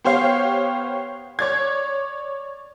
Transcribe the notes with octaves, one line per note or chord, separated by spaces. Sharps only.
B3 G4 C5 C#5 F5
C#5 D5 G#6